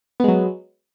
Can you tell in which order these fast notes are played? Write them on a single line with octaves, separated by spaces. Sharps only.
B3 G#3 F#3